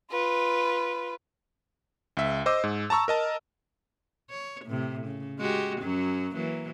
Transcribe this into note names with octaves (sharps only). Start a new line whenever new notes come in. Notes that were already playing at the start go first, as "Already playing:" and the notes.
F4 B4
C#2 E5
C5 D#5 D6 E6
G#2
A5 A#5 C#6 E6
A#4 D#5 A5
C#5
A2 C3
C#3
G#3 F#4 G4
F#2 F#3 C#4
E3 F#3 A#3